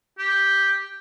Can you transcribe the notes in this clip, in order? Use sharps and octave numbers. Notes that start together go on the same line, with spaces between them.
G4